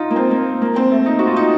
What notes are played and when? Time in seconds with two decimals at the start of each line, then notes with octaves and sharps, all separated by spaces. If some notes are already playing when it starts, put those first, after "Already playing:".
Already playing: D#4 F4
0.10 A#3
0.16 C4
0.31 A#3
0.62 A#3
0.76 C4
0.91 A3
1.06 D#4
1.19 F#4
1.27 F4
1.36 D#4